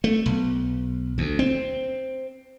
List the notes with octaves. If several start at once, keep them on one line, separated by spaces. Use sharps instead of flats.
A3
B1
D2
C4